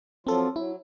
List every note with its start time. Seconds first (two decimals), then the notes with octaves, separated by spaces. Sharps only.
0.27 F3 F#3 C4 F4 A4
0.56 F#3 E4